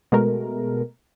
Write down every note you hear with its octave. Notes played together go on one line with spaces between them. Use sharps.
B2 G#3 A3 A#4